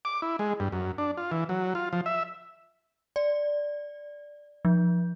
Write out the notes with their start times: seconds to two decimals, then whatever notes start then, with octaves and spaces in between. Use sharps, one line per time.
0.05 D6
0.22 E4
0.39 G#3
0.60 G2
0.72 F#2
0.98 D4
1.17 F4
1.32 E3
1.49 F#3
1.75 F4
1.93 F3
2.06 E5
3.16 D5
4.65 F3